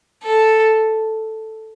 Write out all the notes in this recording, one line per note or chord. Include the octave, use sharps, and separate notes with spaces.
A4